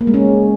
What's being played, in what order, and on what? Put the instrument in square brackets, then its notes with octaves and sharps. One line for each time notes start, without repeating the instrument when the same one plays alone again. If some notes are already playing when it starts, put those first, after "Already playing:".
[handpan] A#3
G#3
C#4